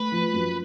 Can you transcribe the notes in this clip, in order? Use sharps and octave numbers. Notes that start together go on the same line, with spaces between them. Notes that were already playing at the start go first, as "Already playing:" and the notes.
Already playing: A3 B4
F3
F#2